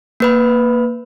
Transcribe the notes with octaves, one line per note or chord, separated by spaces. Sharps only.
A#3 B4 B5